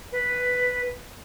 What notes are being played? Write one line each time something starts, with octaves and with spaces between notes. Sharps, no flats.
B4